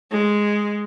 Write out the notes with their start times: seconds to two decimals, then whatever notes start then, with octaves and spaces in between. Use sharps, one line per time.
0.12 G#3